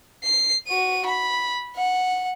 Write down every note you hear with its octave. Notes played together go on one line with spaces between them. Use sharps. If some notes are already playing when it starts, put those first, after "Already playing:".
C7
F#4 D#7
B5
F#5